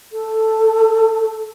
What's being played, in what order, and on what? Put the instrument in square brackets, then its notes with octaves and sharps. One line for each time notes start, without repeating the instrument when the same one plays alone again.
[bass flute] A4